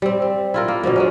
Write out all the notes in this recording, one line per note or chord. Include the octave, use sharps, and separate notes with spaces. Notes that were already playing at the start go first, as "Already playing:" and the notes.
G3 C4
C4
E4 F4 A#4
A#3
B2 D3 F3 A#3
G#3 A#3 C#4